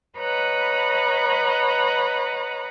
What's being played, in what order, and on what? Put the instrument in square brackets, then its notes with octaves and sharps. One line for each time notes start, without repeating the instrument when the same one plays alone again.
[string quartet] B4 C#5 D#5 F#5 A#5 B5